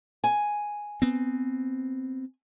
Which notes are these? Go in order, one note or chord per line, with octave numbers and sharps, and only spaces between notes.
G#5
B3 C4